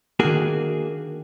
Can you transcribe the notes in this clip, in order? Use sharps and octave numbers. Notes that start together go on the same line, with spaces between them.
D#3 A#3 D4 F#4 G#4